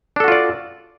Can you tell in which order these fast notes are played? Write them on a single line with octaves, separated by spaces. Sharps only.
D4 A4 F#4 F4 D5